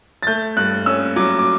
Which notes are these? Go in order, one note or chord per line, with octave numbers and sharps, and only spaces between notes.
A6
A3 G6
G2 F#6
C#4 E6
F#3 D6
D6